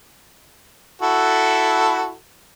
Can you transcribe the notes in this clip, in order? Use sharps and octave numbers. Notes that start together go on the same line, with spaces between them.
E4 F#4 A4